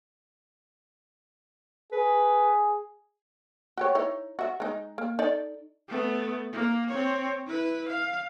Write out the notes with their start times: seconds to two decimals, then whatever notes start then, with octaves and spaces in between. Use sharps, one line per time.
1.92 G#4 B4
3.78 F#4 G4 C#5
3.95 D#4 E4 C#5
4.39 F#4 E5
4.60 G#3 D#4
4.98 A#3
5.19 D#4 A4 D5
5.88 A3 B3
6.52 A#3
6.89 C4 C#5
7.47 E4 B4
7.89 F5